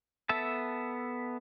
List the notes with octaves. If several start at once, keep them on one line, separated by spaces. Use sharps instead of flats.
B3 A4 E5 A5